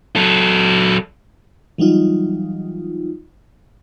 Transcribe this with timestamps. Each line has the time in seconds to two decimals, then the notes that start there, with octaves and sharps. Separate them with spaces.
0.16 F#3 A4
1.78 E3 F#3 G3 D#4 F4